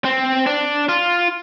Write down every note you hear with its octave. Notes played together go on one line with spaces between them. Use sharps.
C4
D4
F4